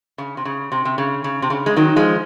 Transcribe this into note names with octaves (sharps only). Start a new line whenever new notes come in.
C#3
C3
C#3
C3
C3
C#3
C#3
C3
C#3
G#3
D#3 F#3
F3 G#3